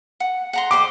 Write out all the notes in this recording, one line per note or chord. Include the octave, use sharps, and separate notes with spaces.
F#5
F#5 A#5 C6
G4 C5 D#5 D6